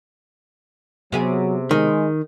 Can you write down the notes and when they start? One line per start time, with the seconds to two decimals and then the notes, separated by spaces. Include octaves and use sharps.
1.12 C3 F#3 B3 G#4
1.71 D#3 G#3